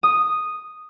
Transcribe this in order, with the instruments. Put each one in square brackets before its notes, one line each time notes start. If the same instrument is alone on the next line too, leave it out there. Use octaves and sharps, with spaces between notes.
[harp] D#6